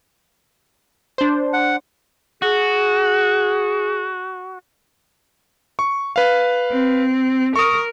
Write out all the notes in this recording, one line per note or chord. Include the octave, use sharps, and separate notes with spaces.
D4 C5
F#5
F#4 G#4
C#6
B4 F5
C4
A#4 C#6 D#6